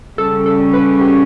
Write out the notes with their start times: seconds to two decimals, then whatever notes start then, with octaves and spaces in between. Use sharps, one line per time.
0.18 C#3 G3 C#4 A4
0.46 A4
0.74 B4
1.01 G4